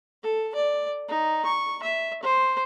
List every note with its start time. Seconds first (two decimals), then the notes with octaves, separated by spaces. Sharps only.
0.23 A4
0.55 D5
1.08 D#4
1.46 C#6
1.83 E5
2.23 C5